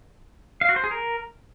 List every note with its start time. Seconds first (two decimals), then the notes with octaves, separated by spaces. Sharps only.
0.61 F5
0.69 F#4
0.76 C5
0.84 G#4
0.91 A#4